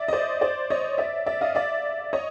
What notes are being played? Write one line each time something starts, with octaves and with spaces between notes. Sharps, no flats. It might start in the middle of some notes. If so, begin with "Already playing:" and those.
Already playing: D5 E5
D#5
C5 D5
C5 D5
C#5 D#5
D5 E5
D5 E5
D#5 F5
D5 E5
C#5 D#5